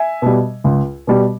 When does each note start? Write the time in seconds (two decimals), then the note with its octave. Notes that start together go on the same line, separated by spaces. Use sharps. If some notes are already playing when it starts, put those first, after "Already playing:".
Already playing: E5 G#5
0.22 B2 G3
0.64 C#2
1.07 B2 G3